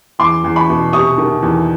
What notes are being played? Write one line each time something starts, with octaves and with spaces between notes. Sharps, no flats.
E2 C6 D6
E2
B5 C#6
B2
C3 C#6 D#6
D#3
E2